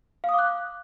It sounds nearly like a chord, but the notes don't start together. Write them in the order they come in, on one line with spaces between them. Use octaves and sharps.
F5 D#6 D6 F#6